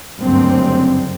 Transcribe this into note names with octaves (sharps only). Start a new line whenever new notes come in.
F#1 D2 G2 C4